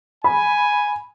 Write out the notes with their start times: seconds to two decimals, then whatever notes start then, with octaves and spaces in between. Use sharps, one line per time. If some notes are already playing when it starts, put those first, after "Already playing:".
0.24 G#5 B5